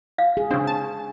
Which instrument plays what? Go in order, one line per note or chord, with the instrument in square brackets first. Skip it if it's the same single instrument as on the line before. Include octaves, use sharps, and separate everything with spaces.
[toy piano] F5
[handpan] G#4
[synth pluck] C#3 C4 [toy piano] D4
[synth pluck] A5